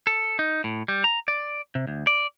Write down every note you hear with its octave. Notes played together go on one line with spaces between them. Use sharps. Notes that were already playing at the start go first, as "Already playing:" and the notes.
A4
D#4
A2
G3
A#5
D5
C3
D2
D5